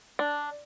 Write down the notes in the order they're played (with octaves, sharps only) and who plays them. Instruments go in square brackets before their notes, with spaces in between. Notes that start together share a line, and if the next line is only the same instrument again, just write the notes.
[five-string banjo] D4